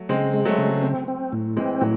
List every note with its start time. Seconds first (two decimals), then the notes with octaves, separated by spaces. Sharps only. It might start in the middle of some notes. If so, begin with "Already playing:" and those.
Already playing: F#3 A3
0.09 C#3 G#3 C4
0.34 G#3
0.45 F#3 A3
0.58 C#3
0.83 C4
1.08 C4
1.32 A2
1.57 E3 G#3 C4
1.81 A2 F#3